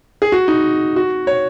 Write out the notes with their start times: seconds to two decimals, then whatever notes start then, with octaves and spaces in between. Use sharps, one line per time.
0.22 G#4
0.32 F#4
0.48 D#4
0.96 F#4
1.27 C#5